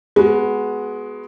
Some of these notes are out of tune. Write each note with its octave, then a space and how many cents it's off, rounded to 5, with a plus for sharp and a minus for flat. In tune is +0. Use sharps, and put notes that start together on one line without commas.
G#3 +10 B3 +0 F#4 +0